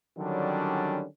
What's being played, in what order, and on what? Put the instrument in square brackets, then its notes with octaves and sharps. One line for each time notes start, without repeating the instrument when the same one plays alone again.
[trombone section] D3 D#3 F#3 G3 C#4 D4